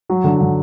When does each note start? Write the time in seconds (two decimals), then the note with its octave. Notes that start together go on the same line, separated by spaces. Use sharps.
0.09 F#3
0.24 D3
0.41 D3